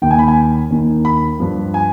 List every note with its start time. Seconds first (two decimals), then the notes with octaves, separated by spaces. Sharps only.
0.02 D#2 D#3 G5
0.11 G#5
0.19 B5
0.28 G#5
0.71 D#2 D#3
1.05 B5
1.40 G2 F3
1.74 G#5